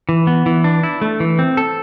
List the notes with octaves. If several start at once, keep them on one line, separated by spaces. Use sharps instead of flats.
E3
B3
E3
D4
E4
A3
E3
C4
A4